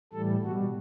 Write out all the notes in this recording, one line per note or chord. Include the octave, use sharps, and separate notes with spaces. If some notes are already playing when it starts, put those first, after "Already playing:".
A2 E3 G3 A4
B2 G3 F#4